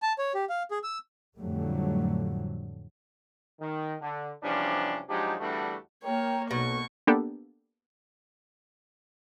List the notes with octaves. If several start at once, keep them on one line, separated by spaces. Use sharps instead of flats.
A5
C#5
G4
F5
G#4
E6
F2 A2 D3 F#3 G3 A3
D#3
D3
E2 C3 F3 G3 C#4 D4
F3 F#3 G#3 D4 D#4 G4
E2 D3 G3 A3 D4 F#4
A#3 A#4 C#5 G5
B1 B2 C#6
A#3 B3 D4 G4 A4